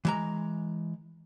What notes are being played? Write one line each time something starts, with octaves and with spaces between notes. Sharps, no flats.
E3 G#3 A#5